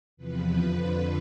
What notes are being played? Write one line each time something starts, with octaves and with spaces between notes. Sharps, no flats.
E2 C3 F3 B4
F2 D3 F3